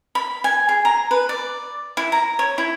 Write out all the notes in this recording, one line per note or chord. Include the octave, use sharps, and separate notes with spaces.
B5
G#5
G#4
A#5
B4
D5
E4
A#5
C#5
E4